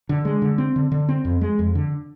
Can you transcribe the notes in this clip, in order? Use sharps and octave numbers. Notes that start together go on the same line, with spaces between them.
D3
G#3
D3
C4
D3
D3
C4
F2
G#3
F2
D3